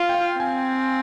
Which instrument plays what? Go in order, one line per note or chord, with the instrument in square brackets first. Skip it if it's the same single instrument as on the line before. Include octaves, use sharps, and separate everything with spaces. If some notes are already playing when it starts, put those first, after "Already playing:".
Already playing: [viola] F4 [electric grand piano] F5
[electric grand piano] G5
F5
[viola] C4 [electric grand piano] G#5